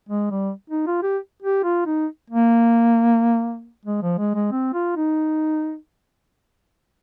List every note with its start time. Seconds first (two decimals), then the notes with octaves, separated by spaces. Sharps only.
0.09 G#3
0.31 G3
0.70 D#4
0.87 F4
1.03 G4
1.42 G4
1.64 F4
1.86 D#4
2.30 A#3
3.85 G#3
4.02 F3
4.18 G#3
4.35 G#3
4.52 C4
4.74 F4
4.96 D#4